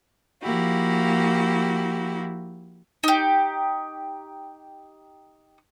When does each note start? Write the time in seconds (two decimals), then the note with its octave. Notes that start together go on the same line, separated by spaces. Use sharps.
0.42 F3 A#3 E4 F#4 G4
3.04 D#4 G4